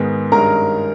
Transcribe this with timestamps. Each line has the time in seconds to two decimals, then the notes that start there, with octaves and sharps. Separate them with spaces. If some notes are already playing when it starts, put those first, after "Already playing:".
Already playing: G#2 D#3 G#3 B3
0.32 G2 D#3 G#3 C#4 A#4 A#5